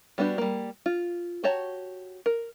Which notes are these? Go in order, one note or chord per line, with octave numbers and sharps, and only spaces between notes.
G3 B3 D4 F#4 G4
G3 A#3
F4
F#4 G4 C#5 A5 A#5
A#4